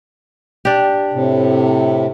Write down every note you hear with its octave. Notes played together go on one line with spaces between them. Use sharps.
D4 G4
A2 C3